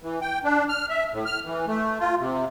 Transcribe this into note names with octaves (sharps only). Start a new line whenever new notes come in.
E3
G5
D4
F6
E5
A2
F6
E3
A3
F4
C3